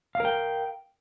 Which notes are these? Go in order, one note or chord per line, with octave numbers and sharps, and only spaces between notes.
A#4 F5 G5